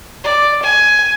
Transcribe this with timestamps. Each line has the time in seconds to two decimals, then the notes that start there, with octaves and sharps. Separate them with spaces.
0.24 D5
0.62 G#5